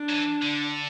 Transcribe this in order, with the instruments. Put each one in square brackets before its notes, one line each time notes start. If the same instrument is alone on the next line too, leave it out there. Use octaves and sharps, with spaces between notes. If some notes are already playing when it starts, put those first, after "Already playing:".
Already playing: [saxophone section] D4
[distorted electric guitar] F#3
E3
D3